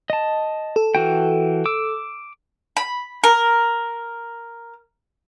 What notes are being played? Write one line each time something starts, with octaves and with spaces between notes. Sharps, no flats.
D#5 A5
A4
E3 F#4 G5
D6 E6
B5
A#4